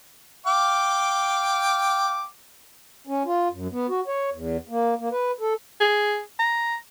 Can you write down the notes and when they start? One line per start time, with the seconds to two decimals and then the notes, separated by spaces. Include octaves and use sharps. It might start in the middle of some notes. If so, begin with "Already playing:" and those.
0.46 F5 G5 D6
3.07 C#4
3.26 F4
3.51 F#2
3.72 B3
3.89 F#4
4.07 C#5
4.32 E2
4.69 A#3
4.99 A#3
5.11 B4
5.40 A4
5.80 G#4
6.39 A#5